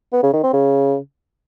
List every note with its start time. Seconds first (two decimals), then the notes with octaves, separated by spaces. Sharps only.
0.13 B3
0.23 C#3
0.33 D#3
0.43 C4
0.54 C#3